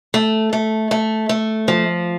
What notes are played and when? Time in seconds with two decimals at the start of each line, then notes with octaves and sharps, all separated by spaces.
0.14 A3
0.53 A3
0.91 A3
1.29 A3
1.68 F3